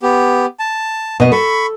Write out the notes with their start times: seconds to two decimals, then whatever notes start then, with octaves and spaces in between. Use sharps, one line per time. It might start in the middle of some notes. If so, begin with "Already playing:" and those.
0.03 B3 G4
0.60 A5
1.20 B2 D#5
1.32 A4 B5 C#6